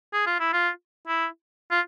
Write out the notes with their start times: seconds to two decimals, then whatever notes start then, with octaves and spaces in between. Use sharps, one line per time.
0.13 G#4
0.26 F4
0.40 E4
0.53 F4
1.07 E4
1.71 F4